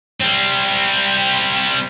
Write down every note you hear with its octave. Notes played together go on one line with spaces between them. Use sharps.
G3 C4